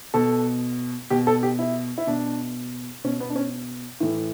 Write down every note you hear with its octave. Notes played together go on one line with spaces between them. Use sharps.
B2 A4
B2 G4
A4
G4
E4
E4
B2 D4
B2 C#4
B3
D4
C#4
A2 E3